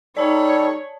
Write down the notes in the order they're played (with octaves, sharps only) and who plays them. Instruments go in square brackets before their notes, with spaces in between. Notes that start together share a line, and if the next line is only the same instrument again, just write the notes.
[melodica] G3 A4 [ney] D#4 [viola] C#5 [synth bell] D5 A5